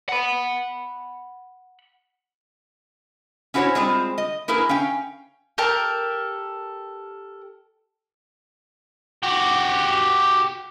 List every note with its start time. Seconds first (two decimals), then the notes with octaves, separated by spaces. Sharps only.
0.09 F#5 B5
3.54 C#4 E4 F#4 A#4 C5 C#5
3.75 G3 G#3 C4 F4
4.18 D#5
4.48 A#3 E4 G#4 A#4 B4
4.69 C#4 F5 G5
5.58 G4 A4 A#4 A5
9.23 F#4 G4